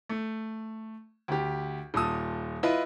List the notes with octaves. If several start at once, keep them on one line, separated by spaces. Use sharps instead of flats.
A3
D2 G4
D#1 A#2 A5 D#6
E4 F4 B4 D#5